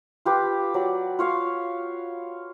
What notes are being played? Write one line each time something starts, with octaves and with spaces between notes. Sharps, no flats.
F4 G4 B4
F#3 D5
F4 C#5 F5